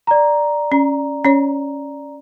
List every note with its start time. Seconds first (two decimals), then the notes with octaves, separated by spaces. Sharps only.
0.07 D5 A#5
0.72 C#4
1.24 C#4 C#5